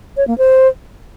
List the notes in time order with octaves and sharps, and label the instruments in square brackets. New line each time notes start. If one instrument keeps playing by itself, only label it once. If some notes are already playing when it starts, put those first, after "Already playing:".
[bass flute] C#5
A#3
C5